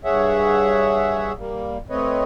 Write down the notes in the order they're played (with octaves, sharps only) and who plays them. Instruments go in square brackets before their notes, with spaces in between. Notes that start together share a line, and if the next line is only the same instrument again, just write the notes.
[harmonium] G2 G#4 C#5 E5 F#5
G3 A#3
A3 C4 B4 C#5 D#5